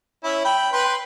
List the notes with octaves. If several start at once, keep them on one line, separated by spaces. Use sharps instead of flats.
C#4 E4
G5 B5
B4 G5 C6